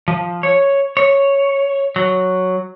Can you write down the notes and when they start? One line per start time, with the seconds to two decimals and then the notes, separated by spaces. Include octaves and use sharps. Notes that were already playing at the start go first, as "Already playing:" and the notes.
0.08 F3
0.43 C#5
0.97 C#5
1.96 F#3